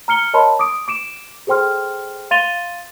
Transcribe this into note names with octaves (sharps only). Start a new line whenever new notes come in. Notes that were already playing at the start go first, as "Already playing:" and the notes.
A#5 F6 C#7 G7
A#4 C#5 D#5 A5 B5 C6
D6 D#6 D7
D6 D7 E7
G#4 A4 C5 G5 C6 F6
F5 C6 A6 D#7 F7 G7